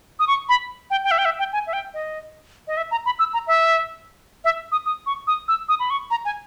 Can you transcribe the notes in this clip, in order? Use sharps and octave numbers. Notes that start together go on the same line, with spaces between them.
D#6
C#6
B5
G5
G5
E5
G5
E5
G5
G#5
E5
G5
D#5
D#5
E5
A#5
B5
E6
A#5
E5
E5
D#6
D#6
C#6
D#6
E6
D#6
B5
C#6
A#5
G#5